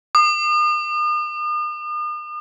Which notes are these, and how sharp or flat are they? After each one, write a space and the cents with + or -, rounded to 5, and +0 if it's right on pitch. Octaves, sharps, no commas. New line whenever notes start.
D#6 -45